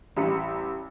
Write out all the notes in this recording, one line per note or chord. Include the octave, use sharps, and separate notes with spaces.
A1 G3 G4 B5 C#7